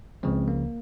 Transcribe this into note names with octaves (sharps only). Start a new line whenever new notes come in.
C#2 C#3 F3 G#3 C4
A#3